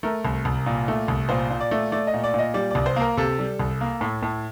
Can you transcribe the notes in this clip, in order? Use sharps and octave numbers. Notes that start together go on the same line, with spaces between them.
A3 A#4
C2
C2
A#2
A3
C2
A#2 C5
A#2
D5
A3
A3 D5
D#5
A#2
D5
A#2 D#5
G3 D5
C2 D5
C5
A#3
A#4
C3 A4
G3
C2
A#3
A2
A2